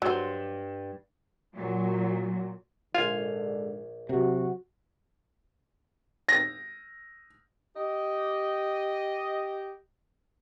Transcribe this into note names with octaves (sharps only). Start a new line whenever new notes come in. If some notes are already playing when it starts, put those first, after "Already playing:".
G2 F#3 C5
A#2 F#3
A#1 G#2 D3 F4 F5 G#5
C3 F#3 F#4
A#6
G4 D#5